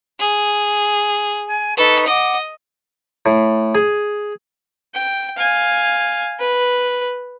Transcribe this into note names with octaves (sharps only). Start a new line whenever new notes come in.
G#4
G#5
D#4 A4 B4 C#6
D#5 F#5 D6
A2
G#4
G5
F5 G#5
B4